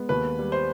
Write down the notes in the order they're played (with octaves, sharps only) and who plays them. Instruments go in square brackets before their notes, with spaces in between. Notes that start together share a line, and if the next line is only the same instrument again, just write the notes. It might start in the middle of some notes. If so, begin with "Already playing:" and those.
Already playing: [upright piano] G#3 B3
D#2 B4
G3
C5